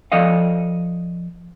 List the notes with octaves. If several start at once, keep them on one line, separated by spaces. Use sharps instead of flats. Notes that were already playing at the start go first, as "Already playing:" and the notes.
F3 A4 D5 D#5 F5